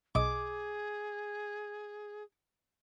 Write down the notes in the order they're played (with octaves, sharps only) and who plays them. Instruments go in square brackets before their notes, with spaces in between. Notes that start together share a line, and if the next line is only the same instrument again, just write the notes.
[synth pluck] B1 D#5 [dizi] G#4 [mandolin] D6